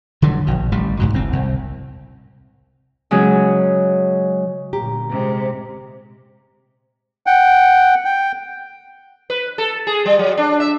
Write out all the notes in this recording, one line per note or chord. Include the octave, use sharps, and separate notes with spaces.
D3 E3 F#3 G3
A#1 B2
A1 A2 G3
C#2 G#2 B2
F#1 A2 C4
C2
C#3 F#3 G#3 C#4 G#4
G1 A#2 G4 A#5
C3 G#3
F#5 G5
G5
B4
A4
G#4
G3
F#3
D4
E5